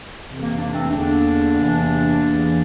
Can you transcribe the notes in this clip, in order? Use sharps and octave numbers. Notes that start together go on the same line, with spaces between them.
F2 C3 E3
A#3
A#3 D4
A3 C4
E2 D3 A#3 D4
E2 C3 E3
E2 E3